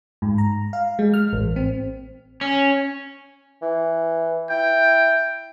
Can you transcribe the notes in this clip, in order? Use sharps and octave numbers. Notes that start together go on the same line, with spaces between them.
G#2
A#5
F5
G#3
F6
A1
C4
C#4
E3
E4 G5